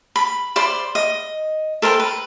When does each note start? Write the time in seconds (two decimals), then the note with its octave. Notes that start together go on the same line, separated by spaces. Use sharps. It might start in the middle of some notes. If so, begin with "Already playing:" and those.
0.16 B5
0.56 C5 D5 B5 C6
0.95 D#5
1.82 A4 A#4 C5 G5
2.00 B4